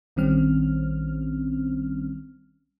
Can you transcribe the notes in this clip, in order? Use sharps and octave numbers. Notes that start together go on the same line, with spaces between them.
A#1 D#3 G3 C4 C#4 F6